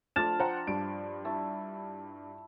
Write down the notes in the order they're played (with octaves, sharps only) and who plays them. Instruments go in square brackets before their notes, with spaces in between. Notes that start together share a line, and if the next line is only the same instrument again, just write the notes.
[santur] F3 D4 [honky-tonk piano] A3 [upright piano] F6 A6 E7
[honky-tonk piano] C5 F#5 G5 [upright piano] A#5
[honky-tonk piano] G2 [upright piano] D7
[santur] E4 A5 C#6